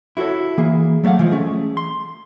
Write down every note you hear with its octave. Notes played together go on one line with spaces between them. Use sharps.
E4 F#4 G4 A4 C#5
E3 A#3 G#4
F#3 A3 D5 F5 F#5
E3 F3 G#3
A3 C#4 G#4
C6